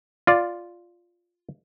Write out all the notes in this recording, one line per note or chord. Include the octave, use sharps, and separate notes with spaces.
F4 D5